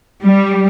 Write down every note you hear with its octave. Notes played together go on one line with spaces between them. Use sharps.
G3